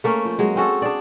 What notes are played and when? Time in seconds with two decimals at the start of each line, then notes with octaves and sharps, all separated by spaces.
0.04 A3 A#3 C#4
0.25 F3
0.39 F#3 G#3
0.56 C4 C#4 F#4 A4
0.82 D4 G#4 D5